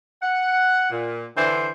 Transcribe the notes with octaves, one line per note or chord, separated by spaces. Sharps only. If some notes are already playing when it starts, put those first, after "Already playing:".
F#5
A#2
D3 E3 D4 C5